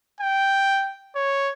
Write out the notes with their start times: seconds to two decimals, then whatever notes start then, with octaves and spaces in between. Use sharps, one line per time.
0.21 G5
1.15 C#5